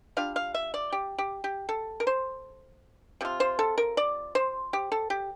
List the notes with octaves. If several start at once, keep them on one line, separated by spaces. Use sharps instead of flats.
G3 D4 F4 F5
F5
E5
D5
G4
G4
G4
A4
A#4
C5
C3 F3 F4
C5
A4
A#4
D5
C5
G4
A4
G4